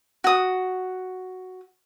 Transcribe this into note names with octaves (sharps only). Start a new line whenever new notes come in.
F#4 D#6